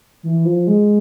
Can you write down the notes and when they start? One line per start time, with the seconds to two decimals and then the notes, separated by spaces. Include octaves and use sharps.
0.23 E3
0.45 F3
0.67 G#3